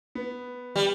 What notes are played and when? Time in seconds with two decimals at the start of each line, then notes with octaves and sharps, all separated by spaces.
0.15 B3
0.76 G3